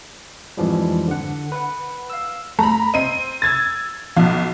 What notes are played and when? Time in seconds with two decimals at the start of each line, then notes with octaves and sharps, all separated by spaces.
0.57 F2 G#2 E3 F3 G3
1.08 D3 F#5
1.52 B4 F#5
2.10 F5 E6
2.59 A3 A#5 B5
2.94 C4 D#5 D#7
3.42 E6 G#6 A6
4.17 B1 F3